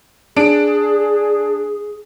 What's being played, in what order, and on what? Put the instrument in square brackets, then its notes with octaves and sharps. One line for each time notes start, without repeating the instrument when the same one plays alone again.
[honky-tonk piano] D4 D7 [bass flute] G#4